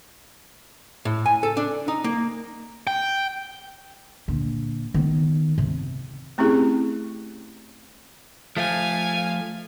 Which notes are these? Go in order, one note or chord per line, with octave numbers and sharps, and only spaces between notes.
A2
G#5
A4
D4
D#4
A#3
G5
A#2 D3
D#3 B3
C3
A3 C4 C#4 E4 G4 G#4
F3 A3 F5 G#5